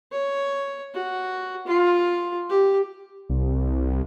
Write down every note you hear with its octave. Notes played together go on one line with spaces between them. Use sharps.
C#5
F#4
F4
G4
C2